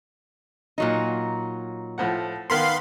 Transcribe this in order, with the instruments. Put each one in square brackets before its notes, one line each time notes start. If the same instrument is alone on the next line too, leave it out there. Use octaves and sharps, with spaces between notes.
[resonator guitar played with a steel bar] A#2 F#3 D#4
[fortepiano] A2 F3 F#5
[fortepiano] D#3 B3 A#4 [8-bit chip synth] F5 B5 C6